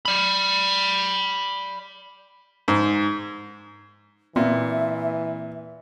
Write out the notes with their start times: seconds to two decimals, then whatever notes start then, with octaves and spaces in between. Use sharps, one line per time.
0.05 D5 B5
2.68 G#2
4.36 A#2 E3 C4 E5